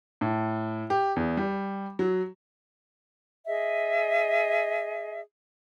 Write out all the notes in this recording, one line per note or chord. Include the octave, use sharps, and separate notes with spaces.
A2
G4
E2
G3
F#3
G#4 D#5 E5